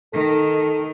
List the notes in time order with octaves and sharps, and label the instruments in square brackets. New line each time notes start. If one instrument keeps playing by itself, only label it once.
[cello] D#3 [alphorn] A4